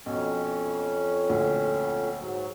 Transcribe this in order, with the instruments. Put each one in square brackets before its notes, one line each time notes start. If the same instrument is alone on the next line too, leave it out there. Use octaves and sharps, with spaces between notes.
[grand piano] B1 [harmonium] F2 C#4
[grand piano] D2 A#2
[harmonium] G#2 F#3